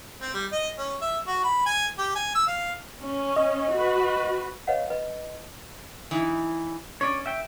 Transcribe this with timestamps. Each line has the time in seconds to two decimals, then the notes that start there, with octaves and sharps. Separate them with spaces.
0.21 C4
0.34 G3
0.52 D#5
0.78 C#4
1.02 E5
1.27 F#4
1.44 B5
1.66 G#5
1.98 G4
2.16 G#5
2.35 E6
2.47 F5
3.01 C#4
3.36 D#5
3.74 F#4 B4
4.67 B4 C#5 D#5 F5 F#5
4.90 B4 D#5
6.11 E3 D#4 E4
7.01 C#4 C#5 D5
7.26 E5 G5